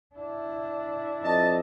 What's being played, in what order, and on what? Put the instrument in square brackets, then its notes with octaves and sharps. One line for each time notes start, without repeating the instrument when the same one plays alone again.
[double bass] D4 E4
[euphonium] F2 [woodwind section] D#5 [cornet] A5